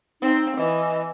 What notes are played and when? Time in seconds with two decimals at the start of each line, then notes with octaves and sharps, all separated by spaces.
0.22 C4 D#4
0.57 E3 D#5